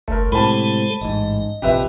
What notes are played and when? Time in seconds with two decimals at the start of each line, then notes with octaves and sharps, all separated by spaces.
0.08 F#1 C2 A3 A#4
0.32 A2 C3 G#3 A4 C5 A5 B5
1.01 A1 G#2 D#5
1.62 A#1 F2 C3 G4 B4 E5